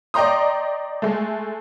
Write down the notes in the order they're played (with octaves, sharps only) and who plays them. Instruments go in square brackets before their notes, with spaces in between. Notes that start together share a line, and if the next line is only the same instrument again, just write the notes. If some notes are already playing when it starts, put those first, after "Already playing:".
[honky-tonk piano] D5 D#5 G5 A#5 C6 D#6
G#3 A3